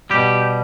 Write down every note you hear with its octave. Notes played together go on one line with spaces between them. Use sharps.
B2 G3 G4